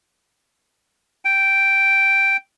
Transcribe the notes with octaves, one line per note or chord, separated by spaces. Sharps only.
G5